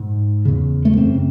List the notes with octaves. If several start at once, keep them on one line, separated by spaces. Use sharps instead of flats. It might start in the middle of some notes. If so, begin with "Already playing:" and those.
Already playing: G#2
E2 C#3
A3
F#2 C#3 C4